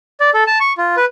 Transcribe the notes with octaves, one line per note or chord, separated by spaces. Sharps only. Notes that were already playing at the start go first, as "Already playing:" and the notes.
D5
A4
A5
C#6
F4
B4